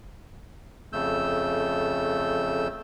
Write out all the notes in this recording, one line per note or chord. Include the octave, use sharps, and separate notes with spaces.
F2 C#3 A3 E6 G6